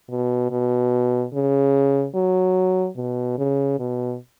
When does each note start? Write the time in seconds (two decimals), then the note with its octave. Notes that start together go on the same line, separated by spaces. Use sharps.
0.10 B2
0.51 B2
1.33 C#3
2.15 F#3
2.97 B2
3.38 C#3
3.79 B2